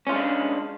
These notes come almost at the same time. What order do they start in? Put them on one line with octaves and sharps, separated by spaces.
C#4 F4 G#3 D4